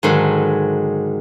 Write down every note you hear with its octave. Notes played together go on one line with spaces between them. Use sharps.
G#2 D3 D#3 F#3